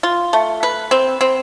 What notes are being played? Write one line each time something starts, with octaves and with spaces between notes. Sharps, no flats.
F4
A3
B4
C4
C4